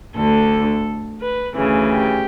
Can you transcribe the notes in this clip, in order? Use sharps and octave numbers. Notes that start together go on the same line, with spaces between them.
D2 D3 A4
B4
D2 C#3 E3
G4